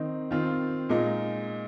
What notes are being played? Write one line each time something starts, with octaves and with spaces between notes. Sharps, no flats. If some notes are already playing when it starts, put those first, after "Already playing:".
Already playing: D#3 C4 D#4
D#3 C4 F4
A#2 G#3 D#4